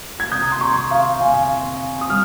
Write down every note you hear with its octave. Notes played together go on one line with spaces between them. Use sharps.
G#6
C3 D#6 G6
A#5
C6
A#5 C#6
C3
F5
C3 F5 G#5
C4
D#6
G3 F6